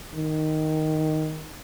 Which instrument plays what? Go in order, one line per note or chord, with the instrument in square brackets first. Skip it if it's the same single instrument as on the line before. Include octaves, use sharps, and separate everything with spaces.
[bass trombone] D#3